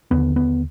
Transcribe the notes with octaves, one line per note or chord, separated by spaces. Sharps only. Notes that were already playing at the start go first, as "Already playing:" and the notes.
D#2 D3 B3
B3